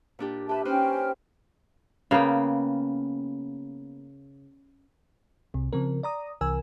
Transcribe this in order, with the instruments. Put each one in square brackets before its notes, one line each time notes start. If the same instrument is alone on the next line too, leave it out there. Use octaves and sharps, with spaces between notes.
[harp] A#2 D4 G4
[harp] G4 B4 [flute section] E5 A5
[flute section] C#4 G5 F6 [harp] D#4 B4 C5
[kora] C#3 A#3 B3 G5
[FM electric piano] C2 C3
C#3 F3 C4 A#4
D5 A#5 D#6
C2 C3 E3 A#4 G#5 E6